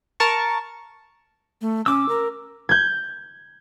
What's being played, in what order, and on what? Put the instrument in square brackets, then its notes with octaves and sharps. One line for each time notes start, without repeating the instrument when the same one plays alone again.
[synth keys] A#4 A5 C#6
[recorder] A3
[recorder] C#4 [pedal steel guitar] D6 E6
[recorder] A#4
[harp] G6 G#6